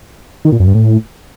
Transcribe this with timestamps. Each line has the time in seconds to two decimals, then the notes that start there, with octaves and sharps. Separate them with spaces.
0.45 D#3
0.52 A#2
0.60 F#2
0.67 G2
0.75 A2